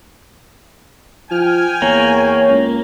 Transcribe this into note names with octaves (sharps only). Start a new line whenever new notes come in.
F3 G5 G#5 F6
E2 A#3 C#5
C#2